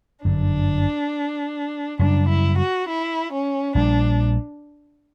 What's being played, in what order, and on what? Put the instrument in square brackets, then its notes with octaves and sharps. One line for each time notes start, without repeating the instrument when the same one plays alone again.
[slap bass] G1 F#2 D3 [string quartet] D4
[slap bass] F#2 C#3 G3 [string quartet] D4
[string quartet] E4
F#4
E4
C#4
[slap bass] A#1 A#2 G3 [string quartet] D4